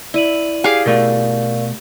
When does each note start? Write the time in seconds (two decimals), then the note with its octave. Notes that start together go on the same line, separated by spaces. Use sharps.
0.14 E4 D5 D#7 F#7
0.64 G4 G#4 F5
0.86 B2 A3 A#4 D5 F5